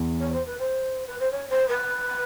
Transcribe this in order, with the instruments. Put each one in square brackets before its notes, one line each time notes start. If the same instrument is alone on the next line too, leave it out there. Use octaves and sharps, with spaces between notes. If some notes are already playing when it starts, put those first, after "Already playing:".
Already playing: [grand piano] E2 E3
[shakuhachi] C#5
C5
B4
C5
B4
C5
C#5
C5
B4